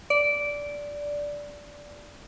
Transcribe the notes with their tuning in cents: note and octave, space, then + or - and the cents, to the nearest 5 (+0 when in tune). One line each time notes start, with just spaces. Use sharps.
D5 -10